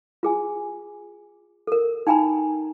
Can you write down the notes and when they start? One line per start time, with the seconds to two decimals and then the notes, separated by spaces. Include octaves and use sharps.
0.23 F4 G#4 G#5
1.67 A4 A#4
2.07 D#4 G5 G#5 A#5 B5